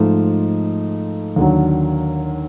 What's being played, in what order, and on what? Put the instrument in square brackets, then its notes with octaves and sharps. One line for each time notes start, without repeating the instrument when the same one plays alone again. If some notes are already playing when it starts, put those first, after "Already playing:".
Already playing: [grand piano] G#2 F3 A3
D#2 D3 F#3